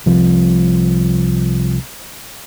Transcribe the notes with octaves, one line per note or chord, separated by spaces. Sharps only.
C2 C3 F3